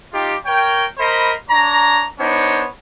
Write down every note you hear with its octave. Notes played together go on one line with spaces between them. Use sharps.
D#4 F4 G4
A#4 C#5 G5
A#4 C5 D#5 B5
D4 C#5 A#5
B3 D4 D#4 C5 C#5